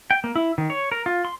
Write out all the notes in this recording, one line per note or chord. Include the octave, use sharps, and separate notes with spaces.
G5
A#3
E4
D#3
C#5
A#4
F4
C6